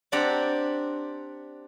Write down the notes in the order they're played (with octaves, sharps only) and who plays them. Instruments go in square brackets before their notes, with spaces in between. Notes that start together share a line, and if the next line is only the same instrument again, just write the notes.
[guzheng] C4 D4 G4 D5 F#5 A#5